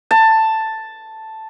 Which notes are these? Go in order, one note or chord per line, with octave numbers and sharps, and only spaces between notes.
A5